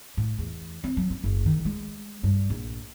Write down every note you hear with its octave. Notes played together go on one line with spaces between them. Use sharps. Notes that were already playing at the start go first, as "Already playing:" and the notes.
A2
E2
C4
F#3
C#4
F#1
D#3
G#3
G2
A#1